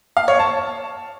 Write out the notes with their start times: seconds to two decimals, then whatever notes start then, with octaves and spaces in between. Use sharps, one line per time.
0.17 F5
0.28 C#5
0.39 A5